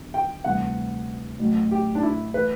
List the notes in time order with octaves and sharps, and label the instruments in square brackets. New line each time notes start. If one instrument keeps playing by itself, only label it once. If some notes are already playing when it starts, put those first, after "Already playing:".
Already playing: [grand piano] E2 D3 F#3
[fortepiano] G5
[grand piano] D2 C3 E3 G3 [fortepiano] F#5
[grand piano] A1 A2 F#3
[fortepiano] G4
D4
E4
[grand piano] E3 A3 [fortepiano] B4